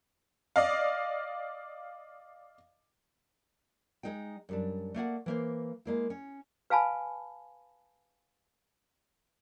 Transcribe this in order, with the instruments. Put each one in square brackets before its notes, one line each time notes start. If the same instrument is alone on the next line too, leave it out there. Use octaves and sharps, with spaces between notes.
[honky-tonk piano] D5 D#5 F5
[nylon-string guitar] G#3 D#4 D#5 G5
F#2 G3 D4
A3 A#3 D5 F#5
E3 A#3 C5
G#3 A#3 E4
C#4
[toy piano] B4 F5 G#5 A5 B5